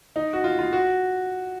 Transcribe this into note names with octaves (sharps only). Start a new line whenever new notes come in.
D#4
F#4
F4
F4
F#4